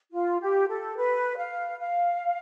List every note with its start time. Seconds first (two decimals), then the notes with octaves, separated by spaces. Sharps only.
0.12 F4
0.40 G4
0.68 A4
0.96 B4
1.37 F5
1.80 F5